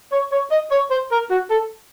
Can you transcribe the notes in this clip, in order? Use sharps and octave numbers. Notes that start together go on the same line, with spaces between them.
C#5
C#5
D#5
C#5
C5
A#4
F#4
A4